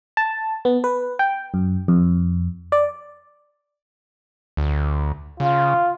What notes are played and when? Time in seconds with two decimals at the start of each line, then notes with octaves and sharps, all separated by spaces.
0.17 A5
0.65 B3
0.84 B4
1.19 G5
1.54 F#2
1.88 F2
2.72 D5
4.57 D2
5.40 C#3 F4